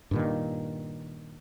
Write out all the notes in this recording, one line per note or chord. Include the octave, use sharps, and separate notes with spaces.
G2 A#2 D#3